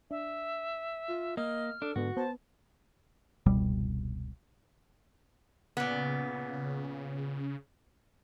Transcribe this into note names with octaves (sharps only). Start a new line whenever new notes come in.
D4 E5
F4
A#3 D#5 F6
D4 A4
G#2 D3 B3 F#4
B3 C5 A5
F1 C#2 B2 G3
A#2 C#3 B3